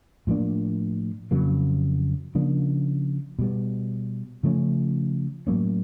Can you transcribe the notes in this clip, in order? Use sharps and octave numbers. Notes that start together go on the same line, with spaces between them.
A2 F3 A#3 D4
F2 C#3 F#3 A#3
C#3 F3 A#3 D4
B2 G3 B3
C#3 F3 A3 C#4
A2 F#3 A#3 C#4